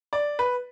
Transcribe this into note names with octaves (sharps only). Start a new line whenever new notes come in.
D5
B4